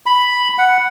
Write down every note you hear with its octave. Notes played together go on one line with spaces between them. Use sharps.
B5
F#5